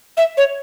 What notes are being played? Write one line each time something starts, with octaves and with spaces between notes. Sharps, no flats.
E5
C#5